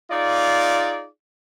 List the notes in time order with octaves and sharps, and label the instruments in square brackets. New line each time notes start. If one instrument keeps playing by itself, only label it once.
[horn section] D#4 F4 G#4 D5